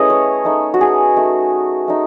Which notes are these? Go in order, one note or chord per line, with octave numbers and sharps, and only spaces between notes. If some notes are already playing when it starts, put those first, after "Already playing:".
Already playing: A3 B3 C#4 E4 G#4 B4 D#5
C#5
A3 D#4
F#4
G#4
A3 D#4
A3 D#4